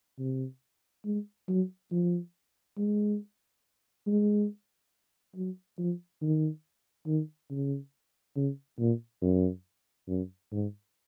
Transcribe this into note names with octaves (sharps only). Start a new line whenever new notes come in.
C3
G#3
F#3
F3
G#3
G#3
F#3
F3
D#3
D#3
C#3
C#3
A#2
F#2
F#2
G#2